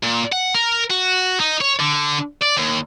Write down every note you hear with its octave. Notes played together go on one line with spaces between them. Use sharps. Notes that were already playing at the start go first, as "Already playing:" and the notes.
A#2
F#5
A#4
F#4
D#4
C#5
D3
D5
D#2